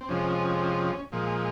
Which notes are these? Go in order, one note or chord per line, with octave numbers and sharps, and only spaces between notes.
C4
F2 C3 F3 G#3 C#4
A#2 F3 G#3